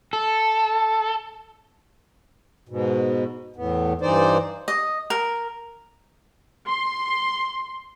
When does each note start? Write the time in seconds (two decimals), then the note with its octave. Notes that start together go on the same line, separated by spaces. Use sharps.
0.13 A4
2.69 G#2 B2
3.56 E2 A2 B3
4.01 G2 E3 D#4 C5 D5
4.68 D#5
5.10 A#4
6.67 C6